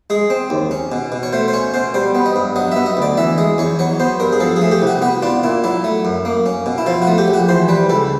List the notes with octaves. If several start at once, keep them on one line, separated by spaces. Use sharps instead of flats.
G#3 G#4
C4
D#2
C#4
B2
B2
C#5
A3 C5
C5
C#4 C#5
B2 C5
G3 C5
B3
D#5
G2
F#3 D#5
B3 E5
D#5
D2 D5
E3 E5
G#3 D#5
E2 C#5
F#3 C#5
B3 C5
G2 A#4
G#4
F3 A4
G#4
A3
G4
C2 F#4
B3 F#4
D4 F4
A#2 E4
F#3 E4
A3
F#2
A#3
C#4
B2
E4
F3 F4
F#4
A3
G4
A#1
F#4
E3 C5
G3 B4
C#2 A4